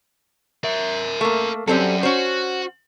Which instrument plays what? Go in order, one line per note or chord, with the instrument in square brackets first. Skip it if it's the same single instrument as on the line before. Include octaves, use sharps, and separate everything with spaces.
[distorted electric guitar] A#4 E5
[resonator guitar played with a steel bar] A3 A#3
[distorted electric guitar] F#2 C#4 [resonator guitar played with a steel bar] G3 C4 A4
[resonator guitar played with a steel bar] C#4 C5 [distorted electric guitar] F#4